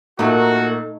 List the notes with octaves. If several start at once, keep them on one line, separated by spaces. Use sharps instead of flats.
A#2 A3 D#4 F#4 A#4